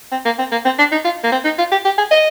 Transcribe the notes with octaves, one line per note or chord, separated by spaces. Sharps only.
C4
A#3
C4
A#3
C4
D4
D#4
F4
A#3
C4
D#4
F4
G4
G4
G#4
D#5